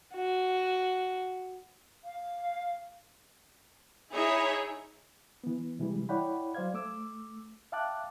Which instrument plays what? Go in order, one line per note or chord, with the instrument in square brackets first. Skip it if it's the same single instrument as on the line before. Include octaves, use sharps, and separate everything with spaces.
[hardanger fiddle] F#4
[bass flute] F5
[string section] D#4 E4 G#4 C#5 E5
[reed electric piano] E3 B3
C3 E3 G3 G#3
E4 C#5 D5 F#5 G5 B5
F#3 C5 D5 F5 G#6
A3 D6 E6
E5 F5 G5 A5 D6 F#6